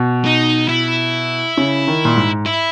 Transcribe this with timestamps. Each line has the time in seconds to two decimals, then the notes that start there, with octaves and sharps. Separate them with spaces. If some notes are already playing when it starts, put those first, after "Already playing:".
Already playing: B2
0.25 D#4
0.69 E4
1.58 C#3
1.88 D#3
2.05 A#2
2.17 G#2
2.46 E4